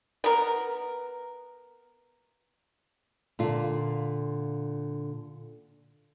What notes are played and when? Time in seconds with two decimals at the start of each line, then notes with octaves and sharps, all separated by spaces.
0.24 B3 A#4
3.39 A#2 D3 F4